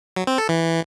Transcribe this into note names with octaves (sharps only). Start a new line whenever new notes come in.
F#3
C4
A4
E3